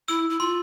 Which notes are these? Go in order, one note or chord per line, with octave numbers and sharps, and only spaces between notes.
E4 E6
E4
F4 C6